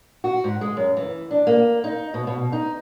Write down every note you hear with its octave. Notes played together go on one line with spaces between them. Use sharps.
F#4
G#2
G#3
F#2
E3
D4
A#3
D#4
B2
B2
D#4